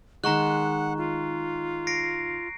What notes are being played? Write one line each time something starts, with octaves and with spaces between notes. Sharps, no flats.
D#3 G#3 F#5 A#5 C#6 F#6
F4
A#6 C7 D7